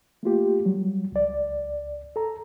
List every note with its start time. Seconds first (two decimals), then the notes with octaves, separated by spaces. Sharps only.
0.23 A3 A#3 F4 G4
0.65 F#3 G3
1.12 C#2 D5
2.16 A4 A#5